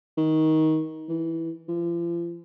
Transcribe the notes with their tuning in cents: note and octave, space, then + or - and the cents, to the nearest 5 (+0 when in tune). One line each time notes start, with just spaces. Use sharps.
D#3 +20
E3 -5
F3 -40